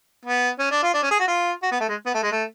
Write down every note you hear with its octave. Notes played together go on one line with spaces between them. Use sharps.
B3
C#4
D4
F4
D4
C#4
G#4
F#4
F4
F#4
B3
A3
G#3
B3
A3
G#3
A3